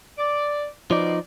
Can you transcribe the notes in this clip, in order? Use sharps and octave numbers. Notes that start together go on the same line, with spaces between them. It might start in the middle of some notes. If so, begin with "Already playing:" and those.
D5
B2 F3 D#4 D5